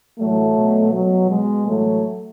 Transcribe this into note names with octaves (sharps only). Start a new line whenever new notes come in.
A2 E3 F#3 A3
B2
B2 F#3
B2 G#3
A2 E3 F#3 A3